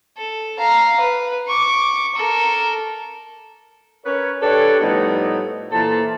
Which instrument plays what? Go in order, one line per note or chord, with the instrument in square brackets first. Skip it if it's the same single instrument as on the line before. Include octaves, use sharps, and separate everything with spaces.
[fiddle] A4
F5 A#5
B4
C#6 D6
A4 A#4
[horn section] C#4 A#4 B4 C#5
D4 G4 A4 B4 C#5 D5
A2 F3 G3 B3 D#4 D#5
A#2 E3 A4 C5 A5